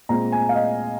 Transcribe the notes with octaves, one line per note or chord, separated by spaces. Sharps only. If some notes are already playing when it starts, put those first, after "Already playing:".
A#2 G#3 C4 A#5
G#5
F5
D#5